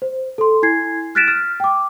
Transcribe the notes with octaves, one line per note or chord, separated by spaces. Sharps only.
C5
A4 C6
E4 G#5 G#6 C7
F6 F#6 A6 B6 D7 E7
F6
G5 D6